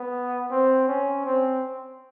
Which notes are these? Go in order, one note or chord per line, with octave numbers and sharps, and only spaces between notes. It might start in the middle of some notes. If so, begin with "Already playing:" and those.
Already playing: B3
C4
C#4
C4